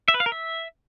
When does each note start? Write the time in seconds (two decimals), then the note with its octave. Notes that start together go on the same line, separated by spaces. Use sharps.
0.08 E5
0.14 B4
0.20 F5
0.26 A#4
0.32 E5